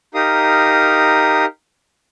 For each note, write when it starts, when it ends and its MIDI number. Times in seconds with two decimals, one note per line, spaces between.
0.14 1.45 63
0.14 1.45 67
0.14 1.45 70
0.14 1.45 77
0.14 1.45 87